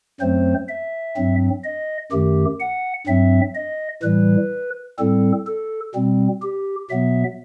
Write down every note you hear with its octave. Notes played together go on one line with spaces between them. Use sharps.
F#2 F#3 A3 C4 C5
E5
G2 F#3 C4
D#5
F#2 D#3 A3 G4
F#5
G2 F#3 C4 E5
D#5
A2 E3 G3 B4
A2 G3 C4 A4
A4
B2 G3 C4
G4
B2 F#3 B3 E5